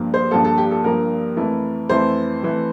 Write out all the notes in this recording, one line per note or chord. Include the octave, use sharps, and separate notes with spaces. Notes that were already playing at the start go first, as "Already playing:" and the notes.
Already playing: G2 F3 A#3
C5
G2 F3 A#3 A4
A4
G4
A4
G2 F3 A#3 A#4
F2 E3 A3 E4
F2 E3 A3 E4 C5
F2 E3 A3 E4